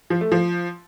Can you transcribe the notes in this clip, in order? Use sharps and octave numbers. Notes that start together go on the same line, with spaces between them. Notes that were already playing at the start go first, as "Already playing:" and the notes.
F3
A3
F3